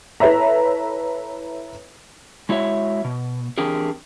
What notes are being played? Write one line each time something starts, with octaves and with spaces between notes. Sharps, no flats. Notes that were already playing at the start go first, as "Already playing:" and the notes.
E4 A4 B4 C#5 E5 A#5
G#3 E4 F#4 C#5 E5
B2
E3 C4 D4 G4 G#4 A#4